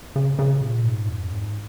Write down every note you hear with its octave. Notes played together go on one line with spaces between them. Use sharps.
C#3
C#3
A#2
G#2
F2
G#2